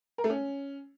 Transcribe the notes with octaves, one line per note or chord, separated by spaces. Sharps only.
A#4
A3
C#4